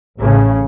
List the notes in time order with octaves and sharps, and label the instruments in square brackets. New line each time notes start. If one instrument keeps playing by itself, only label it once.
[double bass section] A1 A2 C#3